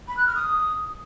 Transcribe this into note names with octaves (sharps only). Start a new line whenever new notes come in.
B5
F#6
F6
D#6